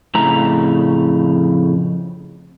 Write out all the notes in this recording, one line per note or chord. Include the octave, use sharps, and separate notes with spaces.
F2 A2 C#3 A#5